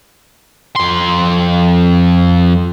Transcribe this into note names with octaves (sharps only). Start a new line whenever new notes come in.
F2 C6